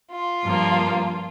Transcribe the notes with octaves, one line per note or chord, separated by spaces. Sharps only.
F4
G2 F3 A#3